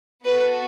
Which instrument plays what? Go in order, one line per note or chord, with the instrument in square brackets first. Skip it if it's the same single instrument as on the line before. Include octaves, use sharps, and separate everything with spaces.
[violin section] B3 F#4 A4 B4